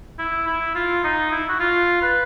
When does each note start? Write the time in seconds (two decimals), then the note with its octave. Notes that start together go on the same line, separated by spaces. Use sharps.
0.19 E4
0.47 E4
0.75 F4
1.04 D#4
1.32 E4
1.49 F#4
1.60 F4
2.02 B4